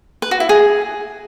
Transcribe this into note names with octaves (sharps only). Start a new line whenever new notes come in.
B4
F#4
E4
G#4